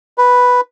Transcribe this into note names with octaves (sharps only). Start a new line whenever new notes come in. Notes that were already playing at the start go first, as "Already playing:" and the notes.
B4